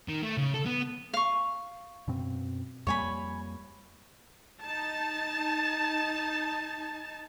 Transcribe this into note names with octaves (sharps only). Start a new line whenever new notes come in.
D#3
A3
C#3
A4
B3
F5 C#6
F#2 B2 C4
F2 G3 A#3 C#5 G#5 B5
D#4 A5